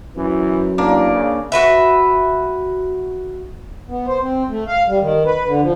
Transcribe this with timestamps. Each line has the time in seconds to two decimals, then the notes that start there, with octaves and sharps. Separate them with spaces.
0.16 F#2 E3
0.78 E2 A#3 D4
1.12 C#3
1.52 F#4 B4 E5
3.88 B3
4.07 C5
4.22 C4
4.49 A3
4.67 F5
4.88 G3
5.01 D#3
5.25 B4
5.46 D3
5.61 F3